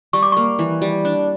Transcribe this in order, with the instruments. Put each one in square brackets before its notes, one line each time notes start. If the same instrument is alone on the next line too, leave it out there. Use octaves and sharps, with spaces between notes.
[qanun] G3 [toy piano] C#6
[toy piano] D6
[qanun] A#3 [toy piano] C#6
[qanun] E3
G3
D4